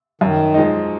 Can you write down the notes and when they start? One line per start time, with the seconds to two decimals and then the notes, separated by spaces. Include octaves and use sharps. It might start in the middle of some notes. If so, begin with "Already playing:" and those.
0.21 F#2 D#3
0.54 F3 G#3 D#4